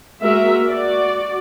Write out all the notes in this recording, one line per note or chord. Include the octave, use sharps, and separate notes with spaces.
G#3 A#3 F#4 A#4 E5
F#4 D5